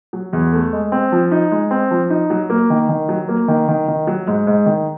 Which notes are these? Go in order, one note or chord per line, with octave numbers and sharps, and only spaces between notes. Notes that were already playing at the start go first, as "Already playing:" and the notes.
F#3
E2
A3
G#3
C4
F3
D#4
G#3
C4
F3
D#4
F#3
A#3
D#3
D#3
F#3
A#3
D#3
D#3
D#3
F#3
G#2
G#2
D#3